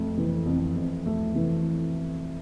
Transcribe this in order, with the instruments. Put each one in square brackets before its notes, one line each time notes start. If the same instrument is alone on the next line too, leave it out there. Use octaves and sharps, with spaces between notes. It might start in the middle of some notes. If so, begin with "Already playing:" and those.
Already playing: [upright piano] F2 A3
E3
F2
F2
A3
E3